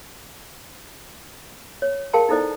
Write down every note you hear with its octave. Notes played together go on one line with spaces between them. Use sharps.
C#5
G#4 A#4 F5 G5 A5 C6
D#4 E4 A4 C5 D5 D#5